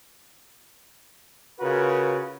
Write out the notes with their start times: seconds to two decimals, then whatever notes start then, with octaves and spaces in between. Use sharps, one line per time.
1.60 C#3 F4 F#4 A#4 B4